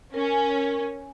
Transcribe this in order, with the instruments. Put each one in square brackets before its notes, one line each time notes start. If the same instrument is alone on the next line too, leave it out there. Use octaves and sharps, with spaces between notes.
[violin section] C#4 [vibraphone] A#4